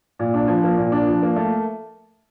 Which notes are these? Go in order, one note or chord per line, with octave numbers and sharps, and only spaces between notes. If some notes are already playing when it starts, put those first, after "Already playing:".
A#2
D4
F3
A#3
A#2
D4
F3
A#3
A3